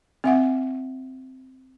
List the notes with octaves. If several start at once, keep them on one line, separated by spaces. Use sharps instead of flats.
C4 E5 F#5